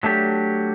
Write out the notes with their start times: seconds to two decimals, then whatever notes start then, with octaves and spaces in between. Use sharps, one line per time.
0.03 F#3 A3 D4 G4